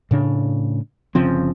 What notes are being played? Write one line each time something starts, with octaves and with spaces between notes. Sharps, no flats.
A2 C#3 D4
G1 C#3 F3 C4